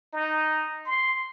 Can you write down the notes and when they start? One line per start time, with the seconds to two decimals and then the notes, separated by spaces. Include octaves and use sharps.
0.13 D#4
0.85 C6